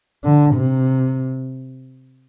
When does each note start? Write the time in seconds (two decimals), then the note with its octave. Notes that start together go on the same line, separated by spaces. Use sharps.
0.24 D3
0.55 C3